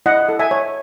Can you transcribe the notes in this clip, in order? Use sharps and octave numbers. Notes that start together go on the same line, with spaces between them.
E4 D#5 F#5
A4
E5 G#5
C#5